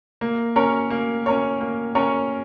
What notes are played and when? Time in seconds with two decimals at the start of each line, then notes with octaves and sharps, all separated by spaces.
0.21 A#3
0.56 C#4 A#4 C#5
0.90 A#3
1.26 C#4 A#4 C#5
1.61 A#3
1.95 C#4 A#4 C#5